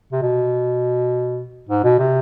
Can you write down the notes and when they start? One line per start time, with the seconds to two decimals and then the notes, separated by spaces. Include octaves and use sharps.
0.12 C3
0.22 B2
1.69 G#2
1.84 B2
1.99 C3